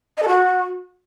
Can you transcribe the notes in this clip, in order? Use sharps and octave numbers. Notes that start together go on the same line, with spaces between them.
D#5
A4
F#4